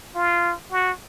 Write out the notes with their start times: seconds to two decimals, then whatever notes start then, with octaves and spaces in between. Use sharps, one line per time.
0.16 F4
0.72 F#4